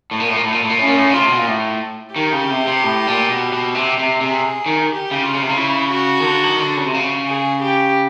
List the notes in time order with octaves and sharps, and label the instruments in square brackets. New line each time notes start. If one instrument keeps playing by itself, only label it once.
[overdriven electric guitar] A2
A#2
A2
A#2
A2
A#2
A2
A#2
[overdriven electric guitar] A2 [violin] C#4
[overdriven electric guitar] A#2
A2
[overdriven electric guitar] C#3 [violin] F4
[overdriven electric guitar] C3
B2
A#2
A2
[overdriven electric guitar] D#3 [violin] G4
[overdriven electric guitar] C#3
C3
C3
A2
A#2
B2
B2
C3
C3
[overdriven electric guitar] C3 [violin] G#4
[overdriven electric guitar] D#3
[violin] G4
[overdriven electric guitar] C#3
[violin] F4
[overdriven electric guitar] C#3
C3
C#3
[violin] E4
F#4
[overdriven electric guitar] D#3
D3
D#3
D3
C#3
C3
C#3
[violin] G#4
G4